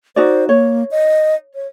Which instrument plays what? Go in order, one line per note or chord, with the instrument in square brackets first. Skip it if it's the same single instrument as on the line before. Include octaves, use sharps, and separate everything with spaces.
[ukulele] D#4 F#4 D5 [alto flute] C5
[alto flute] A#3 [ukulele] C#5
[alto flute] D#5
C#5